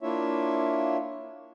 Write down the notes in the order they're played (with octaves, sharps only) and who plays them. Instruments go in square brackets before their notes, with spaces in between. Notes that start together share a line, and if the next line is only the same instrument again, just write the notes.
[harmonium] A#3 D4 E4 F4 C#5 E5